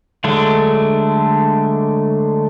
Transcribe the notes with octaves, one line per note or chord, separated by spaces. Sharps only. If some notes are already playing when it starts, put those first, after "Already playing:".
D3 F#3 G#3 A3 D4